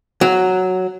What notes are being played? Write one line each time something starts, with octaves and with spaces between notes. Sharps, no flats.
F#3